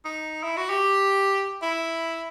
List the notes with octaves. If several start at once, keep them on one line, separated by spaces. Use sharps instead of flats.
D#4
E4
F#4
G4
E4